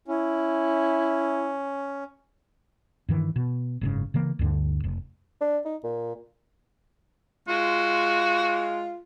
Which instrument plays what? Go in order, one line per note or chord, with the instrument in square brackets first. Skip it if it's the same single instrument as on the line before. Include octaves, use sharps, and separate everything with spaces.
[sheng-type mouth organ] C#4 [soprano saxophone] E4
[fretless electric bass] G2 D#3 E3
B2
F#1 G#2 C#3
C#3 E3 A#3
D2 G2 D3
F1
[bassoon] D4
D#4
A#2
[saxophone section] G#3 F4 [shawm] F#4